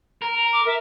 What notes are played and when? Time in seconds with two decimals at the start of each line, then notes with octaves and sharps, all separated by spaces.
0.22 A#4
0.35 A#5
0.53 D6
0.66 A#4 E5